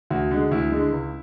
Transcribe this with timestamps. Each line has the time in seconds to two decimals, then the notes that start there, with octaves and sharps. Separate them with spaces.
0.11 D2 F#4
0.31 D3 G#3
0.51 D2 E4
0.72 D3 G#3
0.92 C#2